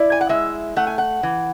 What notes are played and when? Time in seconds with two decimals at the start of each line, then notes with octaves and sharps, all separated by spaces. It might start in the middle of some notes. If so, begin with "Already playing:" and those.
Already playing: E4 D5
0.12 G#5
0.21 F#5
0.29 G#3 E5
0.76 A3 F#5
0.87 G#5
0.98 F#5
1.23 E3